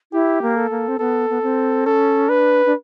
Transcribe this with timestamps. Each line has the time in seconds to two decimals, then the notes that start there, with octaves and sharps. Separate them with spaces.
0.12 E4 G4
0.42 A#3
0.56 A4
0.71 A#3
0.88 C4
0.99 B3 A4
1.30 B3
1.42 C4
1.86 C#4 A4
2.28 D4 B4
2.66 D4